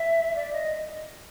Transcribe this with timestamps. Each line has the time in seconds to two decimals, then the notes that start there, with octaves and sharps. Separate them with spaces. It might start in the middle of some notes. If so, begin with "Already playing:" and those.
Already playing: E5
0.36 D5
0.53 D#5